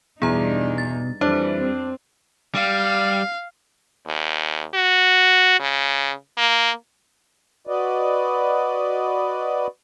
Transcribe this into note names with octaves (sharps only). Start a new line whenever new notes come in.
E2 G2 B2 D4 D#4 G#4 A#5
A6
F2 E3 G3 D4 C5
C4
G3 F5
D#2
F#4
C#3
A#3
F#4 B4 D5 D#5